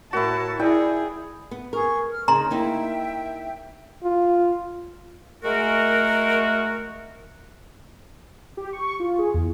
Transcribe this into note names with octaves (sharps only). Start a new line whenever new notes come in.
A2 E4 F#4 G4 A#4 A5
E4 G#4 D5 G5 G#5
B3
G#4 A#4 C#6
F6
C#3 D#4 A#5 C6
A#3 D#4 E4 E5 G5
F4
G#3 A3 F#4 A#4
G4
C#6
F4
G#4
E2